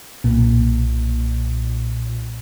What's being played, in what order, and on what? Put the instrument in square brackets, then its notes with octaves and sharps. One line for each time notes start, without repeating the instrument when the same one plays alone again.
[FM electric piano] B1 A#2